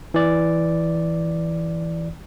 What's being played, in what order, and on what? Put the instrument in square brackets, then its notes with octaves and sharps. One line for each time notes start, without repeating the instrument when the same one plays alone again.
[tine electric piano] E3 D5